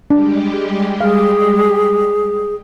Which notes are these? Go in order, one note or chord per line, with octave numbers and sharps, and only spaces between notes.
G3 G#3 D4 G4
G#4 F5